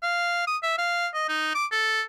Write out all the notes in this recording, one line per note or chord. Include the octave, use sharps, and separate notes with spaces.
F5
D#6
E5
F5
D#5
D#4
D6
A4